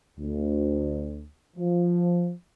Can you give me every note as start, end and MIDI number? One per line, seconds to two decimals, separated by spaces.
0.18 1.24 38
1.57 2.32 53